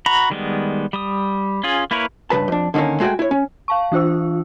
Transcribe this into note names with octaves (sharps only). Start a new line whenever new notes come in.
F#4 A#5 B5
D#3 G3 G#3 B3
G3 D#6
C#4 F4 G#4
A#3 E4 A#4 B4 C#5
C#2 G2 C#3 B4 A5
F2 D4
D3 D#3 G#3 A#3 C#4
G#3 A3 F#4 D#5 G5 G#5
E4 C#5
C#4
F5 A5 C#6
E3 D4 F4 C5 E6